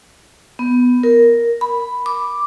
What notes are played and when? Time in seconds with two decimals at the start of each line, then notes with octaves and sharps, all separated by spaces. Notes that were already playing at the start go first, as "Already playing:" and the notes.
0.59 B3
1.03 A#4
1.61 B5
2.06 D6